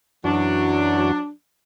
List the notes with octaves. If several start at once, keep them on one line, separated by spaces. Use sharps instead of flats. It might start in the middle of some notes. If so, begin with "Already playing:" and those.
F#2 E3 F#3 D4 F#4